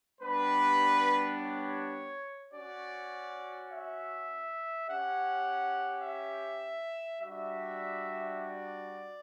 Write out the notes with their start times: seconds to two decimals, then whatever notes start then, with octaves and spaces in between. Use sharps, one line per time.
0.20 G3 B3 D4 G4 B4
1.37 C#5
2.53 C#4 F#4 D5
3.70 E5
4.87 C#4 G4 F#5
6.03 E5
7.20 G3 D4 F#4 E5
8.37 D5